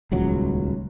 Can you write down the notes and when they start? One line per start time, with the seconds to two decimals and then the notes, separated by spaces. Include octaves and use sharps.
0.12 D#1 C#2 F#3